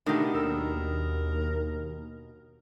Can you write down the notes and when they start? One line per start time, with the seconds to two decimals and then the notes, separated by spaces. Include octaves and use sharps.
0.06 B2 D#3 A3 D4 D#4 G4
0.35 D#2 A#4 E6